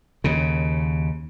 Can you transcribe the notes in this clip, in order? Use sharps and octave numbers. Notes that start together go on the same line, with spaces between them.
D#2 C#3